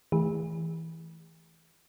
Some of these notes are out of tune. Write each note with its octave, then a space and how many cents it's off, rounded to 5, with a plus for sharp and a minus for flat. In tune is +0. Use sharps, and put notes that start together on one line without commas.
E3 -15 A3 -15 G#4 -40